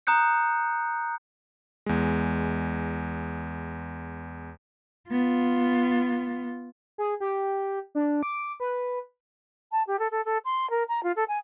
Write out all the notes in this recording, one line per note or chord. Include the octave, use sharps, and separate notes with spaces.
A#5 D#6 F#6 G6 C#7
E2 G#3
B3 F4
G#4
G4
D4
D6
B4
A5
G4
A4
A4
A4
C6
A#4
A#5
F4
A4
G#5